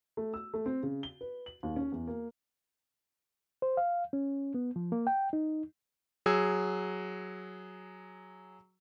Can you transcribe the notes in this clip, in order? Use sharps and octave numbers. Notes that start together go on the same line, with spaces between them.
A3
E6
A3
C4
C#3
G7
B4
F#7
D#2
C#4
E2
A#3
C5
F5
C#4
B3
F3
A#3
G5
D#4
F#3 G#4 E6 G#6